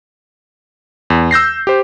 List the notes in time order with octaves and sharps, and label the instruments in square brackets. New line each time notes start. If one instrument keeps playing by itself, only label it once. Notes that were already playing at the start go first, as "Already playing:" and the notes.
[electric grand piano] E2
E6 G6 A#6 C7
G4 C5